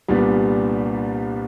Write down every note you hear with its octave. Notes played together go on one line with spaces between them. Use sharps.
C2 A#2 G3 B3 D4